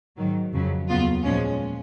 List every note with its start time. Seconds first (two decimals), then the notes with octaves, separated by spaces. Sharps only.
0.17 G#2 D#3 F#3
0.53 F2 C#3 F#3
0.89 D#2 C#3 F#3 B3 F4
1.23 A#2 F3 G#3 C#4